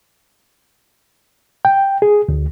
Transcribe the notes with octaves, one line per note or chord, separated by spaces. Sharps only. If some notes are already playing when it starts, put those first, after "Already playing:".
G5
G#4
D2